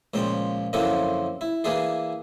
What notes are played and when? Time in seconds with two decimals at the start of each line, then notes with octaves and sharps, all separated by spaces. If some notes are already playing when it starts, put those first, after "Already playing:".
0.14 C#2 A#2 F3 G5
0.73 F#2 D3 F3 A#3 C4 E4
1.41 E4
1.64 E3 A#3 D4 E4 G#4